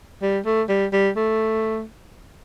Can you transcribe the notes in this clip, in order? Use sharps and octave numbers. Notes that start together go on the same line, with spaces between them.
G3
A3
G3
G3
A3